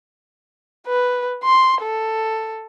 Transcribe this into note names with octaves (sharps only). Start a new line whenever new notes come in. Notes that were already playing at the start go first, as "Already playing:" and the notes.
B4
C6
A4